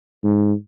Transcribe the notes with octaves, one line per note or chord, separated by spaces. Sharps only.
G#2